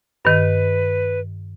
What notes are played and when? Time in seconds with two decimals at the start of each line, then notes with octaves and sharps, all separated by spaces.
0.25 G2 D#3 B4